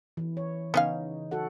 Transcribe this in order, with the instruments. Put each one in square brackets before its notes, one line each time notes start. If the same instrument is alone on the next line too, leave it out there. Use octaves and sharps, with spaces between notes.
[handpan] E3
C#5
[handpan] C#3 D#4 [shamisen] B3 C#4 F5
[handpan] F#4 A4 F#5